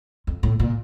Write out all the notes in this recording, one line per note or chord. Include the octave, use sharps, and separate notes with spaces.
F2
A2
A#2